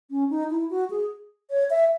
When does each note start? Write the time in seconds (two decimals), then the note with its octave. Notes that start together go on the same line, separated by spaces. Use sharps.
0.10 C#4
0.30 D#4
0.50 E4
0.70 F#4
0.90 G#4
1.50 C#5
1.70 E5